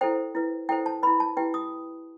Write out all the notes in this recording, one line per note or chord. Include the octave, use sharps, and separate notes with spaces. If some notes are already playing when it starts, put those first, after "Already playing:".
E4 A4 C5 G5
E4 B4
E4 A4 C5 G5
A5
E4 B4 B5
A5
E4 G4 B4 G5
D#6